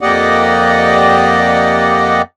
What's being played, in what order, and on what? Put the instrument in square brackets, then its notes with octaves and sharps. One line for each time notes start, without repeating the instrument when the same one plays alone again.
[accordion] F2 A#3 G4 D5 D#5 F#5